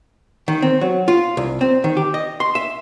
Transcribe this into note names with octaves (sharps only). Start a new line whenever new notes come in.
D#3
C4
F#3
F4
C2
C4
D#3
G4
D#5
C6
E5